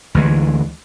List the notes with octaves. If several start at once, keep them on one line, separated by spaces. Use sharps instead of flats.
D2 E3 G#3